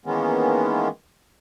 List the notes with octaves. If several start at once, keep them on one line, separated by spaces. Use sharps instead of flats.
D#3 E3 G#3 A#3 B3 C#4